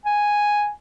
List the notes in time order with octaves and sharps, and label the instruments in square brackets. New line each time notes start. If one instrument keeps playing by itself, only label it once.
[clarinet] G#5